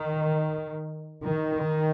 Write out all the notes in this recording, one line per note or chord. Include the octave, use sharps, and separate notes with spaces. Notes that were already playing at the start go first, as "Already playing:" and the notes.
Already playing: D#3
D#3